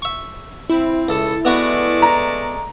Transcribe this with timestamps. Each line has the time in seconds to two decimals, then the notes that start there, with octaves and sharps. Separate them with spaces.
0.02 E5 C#6
0.70 C4 E4
1.09 C#2 A4
1.45 G#3 A3 B3 F#4 B4 D5
2.02 A#5